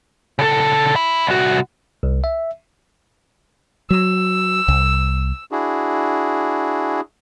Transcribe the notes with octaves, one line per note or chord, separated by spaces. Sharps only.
C#3 A4
E5 B5
C2 F#4
C2
E5
F#3 E6
C2
D4 E4 F#4 G#4